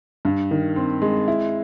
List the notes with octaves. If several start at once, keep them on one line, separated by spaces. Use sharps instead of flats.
G2
D#3
C4
G#3
E4